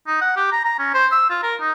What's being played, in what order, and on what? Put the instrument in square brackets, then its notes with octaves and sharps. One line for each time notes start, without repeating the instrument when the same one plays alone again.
[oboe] D#4
F#5
G4
A#5
A#5
C#4
C5
E6
F4
A#4
D#4